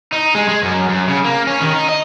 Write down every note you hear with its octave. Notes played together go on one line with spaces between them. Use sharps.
D#4
G#3
G#3
F#2
F#2
C#3
A#3
C#4
D#3
D#4
D#5